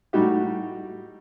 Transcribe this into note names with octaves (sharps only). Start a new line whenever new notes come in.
A2 G3 D#4 F#4 G4